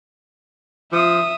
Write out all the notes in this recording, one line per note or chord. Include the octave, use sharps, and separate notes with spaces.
F3 E5 D#6